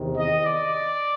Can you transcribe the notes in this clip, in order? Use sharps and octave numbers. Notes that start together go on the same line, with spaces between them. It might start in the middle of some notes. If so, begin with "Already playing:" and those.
Already playing: E2 C3 D#3
D#5
D5